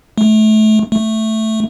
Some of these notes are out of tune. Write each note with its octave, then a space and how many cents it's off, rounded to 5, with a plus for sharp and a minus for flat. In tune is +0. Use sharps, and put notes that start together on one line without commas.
A3 -25
A3 +0